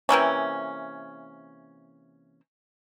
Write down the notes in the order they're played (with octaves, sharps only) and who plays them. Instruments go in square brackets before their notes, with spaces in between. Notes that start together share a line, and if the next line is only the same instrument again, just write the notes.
[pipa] C3 E3 A#3 C#4